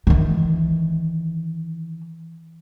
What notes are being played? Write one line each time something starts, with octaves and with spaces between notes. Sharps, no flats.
D#3 E3